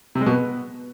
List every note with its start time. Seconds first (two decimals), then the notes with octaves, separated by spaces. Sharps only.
0.15 C3
0.21 G#3
0.26 B2
0.32 B3